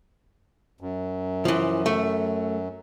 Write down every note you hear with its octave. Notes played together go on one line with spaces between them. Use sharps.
F#2
E3 F3
A3